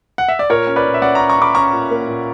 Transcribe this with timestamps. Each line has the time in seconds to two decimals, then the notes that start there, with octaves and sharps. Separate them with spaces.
0.18 F#5
0.28 E5
0.39 D5
0.50 A#2 A#4 C#5
0.67 C#4
0.76 B4 D5
0.86 A#2
0.94 E5
1.02 C#4 D5 F#5
1.15 C#4 A#5 C#6
1.29 A#5 C#6
1.38 C#4 B5 D6
1.55 C#4 A#5 C#6
1.73 A#2
1.90 A#3
2.08 A#2